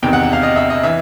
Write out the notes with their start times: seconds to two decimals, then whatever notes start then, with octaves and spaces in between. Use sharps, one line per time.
0.03 E2 C3 D#3 G5
0.13 F#5
0.23 F#5
0.33 F5
0.43 D#5
0.56 E5
0.70 D#5
0.83 E3 E5